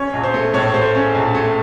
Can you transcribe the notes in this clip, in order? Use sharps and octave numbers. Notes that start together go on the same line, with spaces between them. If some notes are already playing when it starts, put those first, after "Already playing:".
Already playing: C#4 C#5
A#1
C5
A3
A2 C#5
A3 C5
C#4
A#1
A3